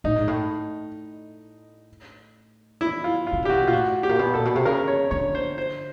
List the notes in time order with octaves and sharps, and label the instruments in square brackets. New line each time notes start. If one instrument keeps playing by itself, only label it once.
[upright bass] A2 [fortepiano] D#4
[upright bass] G#2
A2
[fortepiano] E4
F4
F4
[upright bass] C#3
[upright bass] C3 [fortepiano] G4
[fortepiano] F#4
[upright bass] B2
A#2
[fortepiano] F4
[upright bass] A2 [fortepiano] F#4
[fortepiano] G4
[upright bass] A#2
B2
[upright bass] A#2 [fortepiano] A4
[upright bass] B2
C3
[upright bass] C#3 [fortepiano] A#4
[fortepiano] C#5
[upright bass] D3 [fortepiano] C#5
[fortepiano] C5
C5